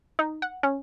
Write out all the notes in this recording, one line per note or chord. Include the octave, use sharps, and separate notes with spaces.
D#4
F#5
C#4